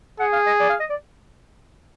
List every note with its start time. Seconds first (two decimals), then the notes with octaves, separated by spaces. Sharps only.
0.20 G#4 F#5
0.33 F5
0.46 D#5
0.60 D5
0.70 F5
0.80 D#5
0.90 D5